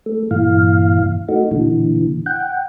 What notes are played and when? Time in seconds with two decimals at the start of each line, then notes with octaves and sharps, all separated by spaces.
0.06 A3
0.31 G2 A#2 E3 F5
1.29 A3 D#4 F#4
1.51 A#2 D3 E3
2.26 F#5 G5